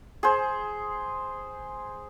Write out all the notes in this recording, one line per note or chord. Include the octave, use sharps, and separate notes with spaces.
G#4 C5